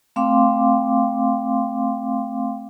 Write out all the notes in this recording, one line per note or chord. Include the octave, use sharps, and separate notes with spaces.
A3 C4 F5 G5 C6 D6